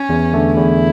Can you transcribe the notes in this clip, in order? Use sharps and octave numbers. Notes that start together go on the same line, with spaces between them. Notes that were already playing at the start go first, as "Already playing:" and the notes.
Already playing: C#4
E2
D3 A3 D4
E2 E4